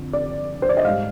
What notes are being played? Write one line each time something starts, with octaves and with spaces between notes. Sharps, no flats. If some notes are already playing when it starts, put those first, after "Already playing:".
Already playing: F2 D3
D5
C5
D5
D#5
G#2 G3 F5